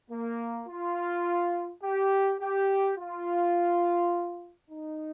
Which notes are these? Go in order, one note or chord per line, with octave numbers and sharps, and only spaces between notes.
A#3
F4
G4
G4
F4
D#4